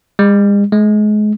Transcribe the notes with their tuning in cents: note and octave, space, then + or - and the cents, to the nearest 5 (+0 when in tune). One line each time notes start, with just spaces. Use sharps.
G#3 -45
G#3 +30